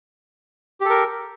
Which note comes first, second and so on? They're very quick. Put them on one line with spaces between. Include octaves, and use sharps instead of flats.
G4 A4 A#4